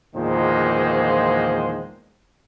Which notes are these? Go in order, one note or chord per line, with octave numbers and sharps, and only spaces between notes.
E2 A#2 D#3 F3 G#3 C5